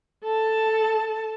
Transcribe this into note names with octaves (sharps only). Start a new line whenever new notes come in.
A4 A5